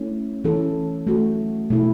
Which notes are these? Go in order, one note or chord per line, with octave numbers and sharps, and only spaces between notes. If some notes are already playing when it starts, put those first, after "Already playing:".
Already playing: A3 C#4 E4
E3 C#4 E4 A4
A3 F#4 A4
B2 A3 E4